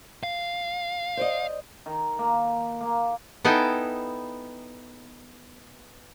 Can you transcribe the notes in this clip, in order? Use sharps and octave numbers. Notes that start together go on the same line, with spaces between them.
F5
C5 D5 D#5
D#3
A#3
A#3
B3 D#4 E4 A4 G5 G#5